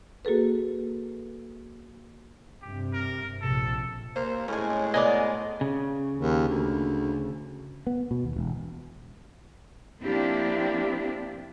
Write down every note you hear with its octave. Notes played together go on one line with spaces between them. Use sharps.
A#3 F#4 G#4 A4 B4
G2 C3 G4
A#4
A#1 C3 A4
A#3 C5
A2 G#3 C#4 G#5
B3 A#4 D5 D#5 G#5 D#7
C#3
D#2
D2
B3
B2
D#2
E1
F3 A#3 C4 D4 E4 G4